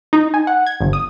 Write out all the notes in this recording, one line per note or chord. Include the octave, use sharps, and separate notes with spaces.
D#4
G#5
F#5
G#6
G1
D#6